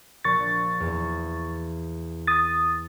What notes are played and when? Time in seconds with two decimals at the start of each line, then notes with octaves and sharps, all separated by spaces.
0.24 A#1 C#6 A6
0.80 E2
2.27 D#6 A6